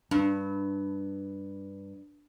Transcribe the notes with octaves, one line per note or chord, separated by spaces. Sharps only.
G2 D4